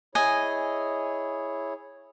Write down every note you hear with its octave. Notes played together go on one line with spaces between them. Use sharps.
E4 G#4 C#5 D#5 G#5